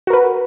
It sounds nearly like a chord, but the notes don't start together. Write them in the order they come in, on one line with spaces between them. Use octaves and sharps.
F#4 A#4 B4